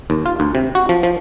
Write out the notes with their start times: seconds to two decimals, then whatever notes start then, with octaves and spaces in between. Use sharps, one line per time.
0.10 D#2
0.26 F4
0.40 D2
0.55 C3
0.75 F#4
0.89 F3
1.03 F3